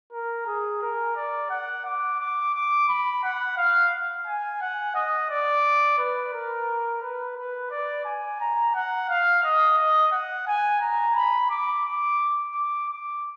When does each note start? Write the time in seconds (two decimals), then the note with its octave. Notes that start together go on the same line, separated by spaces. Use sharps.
0.12 A#4
0.46 G#4
0.82 A#4
1.16 D5
1.50 F#5
1.85 D6
2.19 D6
2.54 D6
2.89 B5
3.23 F#5
3.57 F5
4.27 G#5
4.61 F#5
4.95 D#5
5.30 D5
5.98 B4
6.33 A#4
7.02 B4
7.37 B4
7.71 D5
8.05 G#5
8.41 A#5
8.75 F#5
9.09 F5
9.43 D#5
9.78 D#5
10.12 F#5
10.47 G#5
10.81 A#5
11.15 B5
11.50 D6
11.85 D6
12.55 D6
12.89 D6